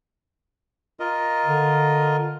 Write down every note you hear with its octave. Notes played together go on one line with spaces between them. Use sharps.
F4 A#4 D#5
D3